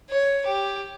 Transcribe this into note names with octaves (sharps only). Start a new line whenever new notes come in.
C#5
G4